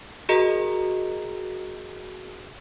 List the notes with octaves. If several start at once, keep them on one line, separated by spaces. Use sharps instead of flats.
F#4 G#4 A#4 D#5 A#5